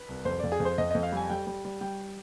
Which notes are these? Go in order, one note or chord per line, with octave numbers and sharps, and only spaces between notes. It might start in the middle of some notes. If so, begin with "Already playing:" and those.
Already playing: B4
C2
F2 C5
F2 D5
G#4
F2
C5
F2 D#5
F2 D#5
F5
G3 G#5
G3 G5
G3
G3
G3 G5